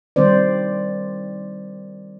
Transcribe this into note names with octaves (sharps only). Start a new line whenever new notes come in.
D#3 G3 C4 C5 D5